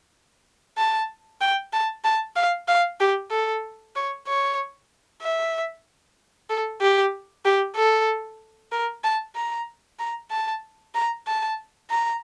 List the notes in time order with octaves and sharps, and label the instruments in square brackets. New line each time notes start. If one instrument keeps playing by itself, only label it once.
[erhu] A5
G5
A5
A5
F5
F5
G4
A4
C#5
C#5
E5
A4
G4
G4
A4
A#4
A5
A#5
A#5
A5
A#5
A5
A#5